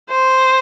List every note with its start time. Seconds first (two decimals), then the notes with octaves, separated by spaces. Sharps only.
0.10 C5